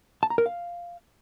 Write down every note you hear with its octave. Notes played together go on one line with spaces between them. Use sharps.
A5
A#5
A#4
F5